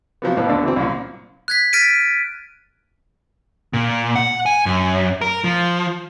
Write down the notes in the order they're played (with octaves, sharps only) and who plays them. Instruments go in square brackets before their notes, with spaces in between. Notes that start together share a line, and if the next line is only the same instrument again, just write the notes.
[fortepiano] C3 F3 F#3 B3
D#2 A2 F3 B3
D2 D3 B3 D5
E3 F#3 C4
C2 F#2 A#2
[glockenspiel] F#6 G#6 B6
F6 A6 B6 D7 D#7
[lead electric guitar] A#2
F#5
G#5
F#2
A#4
F3